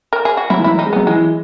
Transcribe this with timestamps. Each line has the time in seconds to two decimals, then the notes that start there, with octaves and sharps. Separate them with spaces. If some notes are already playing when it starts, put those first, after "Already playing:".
0.13 A#4
0.25 G#4
0.37 F#4
0.50 F#3 E4
0.58 E3
0.64 F#3 E4
0.79 D#4
0.86 G#3
0.93 F#3 B3
1.07 E3 G#3